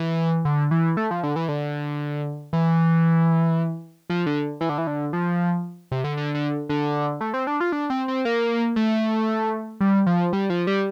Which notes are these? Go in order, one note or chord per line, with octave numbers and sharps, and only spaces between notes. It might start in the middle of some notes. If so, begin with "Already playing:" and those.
Already playing: E3
D3
E3
A3
F3
D3
E3
D3
E3
F3
D3
E3
D3
E3
D3
F3
C3
D3
D3
D3
D3
A3
C4
D4
F4
D4
C4
C4
A#3
A3
G3
F3
G3
F3
G3